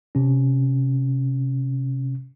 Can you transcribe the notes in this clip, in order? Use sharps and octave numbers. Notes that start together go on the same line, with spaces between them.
C3 C#4